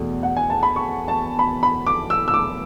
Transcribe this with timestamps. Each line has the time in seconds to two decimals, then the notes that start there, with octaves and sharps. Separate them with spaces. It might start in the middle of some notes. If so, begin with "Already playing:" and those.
Already playing: E2 B2 A3
0.23 F#5
0.37 G#5
0.50 A5
0.63 B5
0.76 C#6
1.08 A5
1.39 B5
1.63 B5
1.86 D6
2.10 E6
2.28 E6
2.34 D6